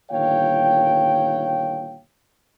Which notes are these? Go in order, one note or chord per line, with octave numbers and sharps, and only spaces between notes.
G1 A#2 D#3 C#5 F5 G5